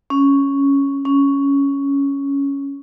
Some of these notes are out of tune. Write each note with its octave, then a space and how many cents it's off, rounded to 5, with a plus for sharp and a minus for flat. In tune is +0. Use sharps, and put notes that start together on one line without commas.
C#4 +0
C#4 +5